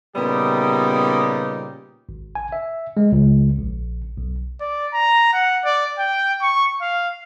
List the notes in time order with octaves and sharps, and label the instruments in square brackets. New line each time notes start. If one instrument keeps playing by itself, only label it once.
[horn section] A#2 C#3 G3 B3 D#4 G4
[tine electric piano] G#1
G#5
E5
G#3
C#2
A#1
B1
[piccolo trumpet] D5
A#5
F#5
D5
G5
C#6
F5